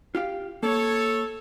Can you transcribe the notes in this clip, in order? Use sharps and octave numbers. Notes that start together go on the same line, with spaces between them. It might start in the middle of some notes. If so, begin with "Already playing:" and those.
F4 G4 F5
A#3 A4 C#5